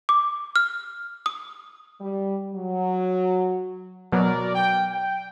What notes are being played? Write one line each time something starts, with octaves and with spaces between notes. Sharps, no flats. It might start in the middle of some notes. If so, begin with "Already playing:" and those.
D6
F6
D#6
G3
F#3
B2 F#3 A#4 D5
G5
G5